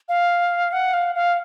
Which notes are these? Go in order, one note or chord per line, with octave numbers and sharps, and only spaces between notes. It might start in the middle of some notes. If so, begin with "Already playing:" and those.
F5
F#5
F5
F5